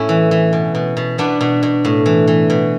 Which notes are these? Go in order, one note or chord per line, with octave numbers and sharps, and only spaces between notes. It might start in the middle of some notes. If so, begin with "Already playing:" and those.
Already playing: A2 C#4 E4
E3
E3
B2
B2
B2
B2 B3 D4
B2
B2
A2
E3
E3
B2